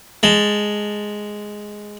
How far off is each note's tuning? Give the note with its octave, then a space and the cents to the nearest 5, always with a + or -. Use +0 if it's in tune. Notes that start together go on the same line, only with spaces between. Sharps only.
G#3 +0 A5 +15